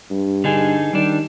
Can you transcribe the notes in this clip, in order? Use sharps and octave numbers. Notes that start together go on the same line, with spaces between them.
G2
D3 D#4 G#4
D#3 G3 D4